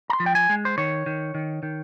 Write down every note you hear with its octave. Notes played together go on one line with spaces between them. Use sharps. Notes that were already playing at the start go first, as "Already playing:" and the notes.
A#5
C6
F3
G5
G#5
G#3
C5
D#3 C#5
D#3
D#3
D#3